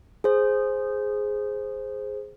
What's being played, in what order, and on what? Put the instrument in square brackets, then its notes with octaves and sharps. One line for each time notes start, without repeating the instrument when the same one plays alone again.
[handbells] G#4 C5